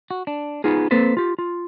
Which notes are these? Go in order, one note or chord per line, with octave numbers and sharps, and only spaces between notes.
F#4
D4
B3 D#4 F4 G#4
A#3 C4 A4 B4 C5
F4 G4
F4